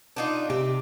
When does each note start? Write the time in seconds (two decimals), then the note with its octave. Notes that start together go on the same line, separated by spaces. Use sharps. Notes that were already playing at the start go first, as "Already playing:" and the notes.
0.16 D4 D#4 F4
0.50 C3 G4